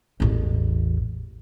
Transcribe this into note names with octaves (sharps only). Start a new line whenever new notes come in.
A1 E2